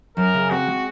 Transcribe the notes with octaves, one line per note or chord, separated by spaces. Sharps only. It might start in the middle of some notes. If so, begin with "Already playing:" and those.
F#2 A#4
C#3
C4 F#4
G#3